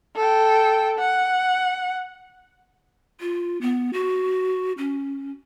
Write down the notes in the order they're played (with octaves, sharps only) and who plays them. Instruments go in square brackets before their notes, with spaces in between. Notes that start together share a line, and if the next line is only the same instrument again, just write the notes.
[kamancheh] A4 G5
F#5
[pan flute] F4
B3
F#4
C#4